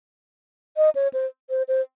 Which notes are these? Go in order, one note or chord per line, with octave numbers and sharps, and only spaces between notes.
D#5
C#5
C5
C5
C5